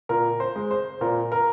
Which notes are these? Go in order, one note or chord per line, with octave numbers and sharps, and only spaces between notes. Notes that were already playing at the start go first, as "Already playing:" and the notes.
A#2 A#4
C5
G#3
C5
A#2 A#4
A#4